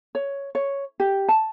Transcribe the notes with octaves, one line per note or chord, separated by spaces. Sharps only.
C#5
C#5
G4
A5